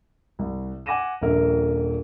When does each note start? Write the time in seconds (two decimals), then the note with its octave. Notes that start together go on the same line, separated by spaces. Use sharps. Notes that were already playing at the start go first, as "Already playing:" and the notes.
0.39 C2
0.86 F#5 G#5 D6 A#6 D#7 E7
1.21 D#1 A#1 A#3 A#4 E5